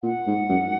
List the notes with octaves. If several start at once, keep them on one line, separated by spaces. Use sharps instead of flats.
A#2 F#5
G#2
F#2